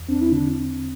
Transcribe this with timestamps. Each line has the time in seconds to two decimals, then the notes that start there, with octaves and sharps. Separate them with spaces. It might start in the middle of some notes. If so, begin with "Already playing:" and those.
Already playing: E2
0.09 C4 D4
0.22 E4
0.32 D3 D4